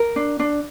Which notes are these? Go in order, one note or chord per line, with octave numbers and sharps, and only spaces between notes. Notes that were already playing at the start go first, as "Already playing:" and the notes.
Already playing: A#4
D4
D4